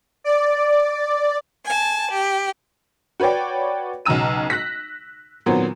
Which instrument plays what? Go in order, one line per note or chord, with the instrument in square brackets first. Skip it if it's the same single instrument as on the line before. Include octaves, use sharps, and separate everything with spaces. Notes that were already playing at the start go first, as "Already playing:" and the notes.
[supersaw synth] D5
[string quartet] G#5 A5
G4
[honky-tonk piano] F#4 B4 C#5 D5 G5
B1 C#3 F#3 A#5 E6 D#7
F#6 A#6 B6
A#2 D#3 F#3 B3 C4